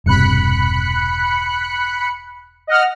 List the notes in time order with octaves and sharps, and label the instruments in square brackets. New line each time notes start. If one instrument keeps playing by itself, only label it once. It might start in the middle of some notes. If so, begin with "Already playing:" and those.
[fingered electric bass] E1 G2 C3 [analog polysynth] B5 F#6 C#7
[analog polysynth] D#5 F#5 F6